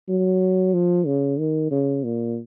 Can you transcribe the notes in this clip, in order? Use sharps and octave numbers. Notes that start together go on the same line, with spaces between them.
F#3
F3
C#3
D#3
C#3
A#2